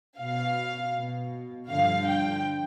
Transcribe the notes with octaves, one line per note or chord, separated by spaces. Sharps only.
B2 F5
B2
G2 D3 F3 F5
G5